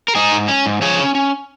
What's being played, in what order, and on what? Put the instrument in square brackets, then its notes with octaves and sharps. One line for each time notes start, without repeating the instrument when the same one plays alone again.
[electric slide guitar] A#4
G#2 D#4 G#4
G#2
C#4
G#2
F3 G#4 C#5
C#4
C#4